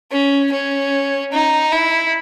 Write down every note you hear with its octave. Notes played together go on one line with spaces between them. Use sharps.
C#4
C#4
D#4
E4